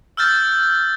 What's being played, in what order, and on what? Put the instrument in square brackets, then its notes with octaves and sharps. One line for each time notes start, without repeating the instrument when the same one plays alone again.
[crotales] E6 F6 G6 A6